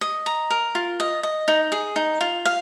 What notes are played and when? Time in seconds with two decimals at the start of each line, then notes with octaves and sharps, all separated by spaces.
0.01 D#5
0.26 A#5
0.50 A#4
0.75 F4
1.00 D#5
1.23 D#5
1.48 D#4
1.72 G#4
1.96 D#4
2.21 F4
2.45 F5